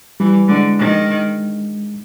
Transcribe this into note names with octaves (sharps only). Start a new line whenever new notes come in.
E3 G3
D3 G#3
D#3